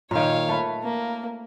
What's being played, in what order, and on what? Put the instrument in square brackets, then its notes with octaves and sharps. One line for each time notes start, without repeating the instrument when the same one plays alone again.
[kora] A#2 D#3 [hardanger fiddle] C#5 F5
[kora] A3 B4
[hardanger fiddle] A#3